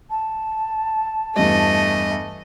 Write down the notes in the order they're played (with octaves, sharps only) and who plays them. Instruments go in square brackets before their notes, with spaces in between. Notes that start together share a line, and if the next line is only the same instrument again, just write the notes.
[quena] A5
[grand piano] E2 G2 [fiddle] A3 D#5